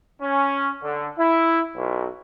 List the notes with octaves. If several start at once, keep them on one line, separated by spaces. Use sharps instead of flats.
C#4
D3
E4
B1